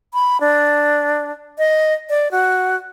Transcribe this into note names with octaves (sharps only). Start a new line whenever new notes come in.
B5
D4
D#5
D5
F#4